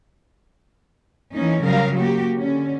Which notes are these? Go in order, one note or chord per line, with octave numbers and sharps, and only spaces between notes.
E3 A#3 C#4 D#4
C#3 F#3 G3 A#4 F5
A#3 F#4 G4
D3 C#4